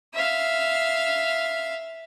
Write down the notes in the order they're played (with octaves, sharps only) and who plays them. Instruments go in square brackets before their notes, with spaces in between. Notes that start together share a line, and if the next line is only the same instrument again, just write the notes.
[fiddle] E5 F5